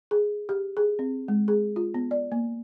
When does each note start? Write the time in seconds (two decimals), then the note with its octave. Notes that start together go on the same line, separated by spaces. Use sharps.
0.11 G#4
0.49 G4
0.77 G#4
0.99 C4
1.28 G#3
1.48 G#4
1.76 F4
1.94 B3
2.11 D5
2.32 A#3